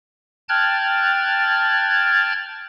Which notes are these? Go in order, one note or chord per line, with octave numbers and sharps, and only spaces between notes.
G5 A5 F6 F#6 G#6 A6